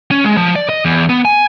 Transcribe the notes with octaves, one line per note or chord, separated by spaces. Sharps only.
C#4
G#3
F3
D5
D#5
E2
B3
G#5